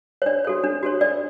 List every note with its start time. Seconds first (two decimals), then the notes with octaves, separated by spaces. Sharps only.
0.22 C#5
0.26 D4 D5
0.45 F#4 A4 C#5
0.64 D4
0.83 F#4 A4 C#5
1.01 D4 D5